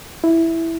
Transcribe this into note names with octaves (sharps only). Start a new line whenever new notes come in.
E4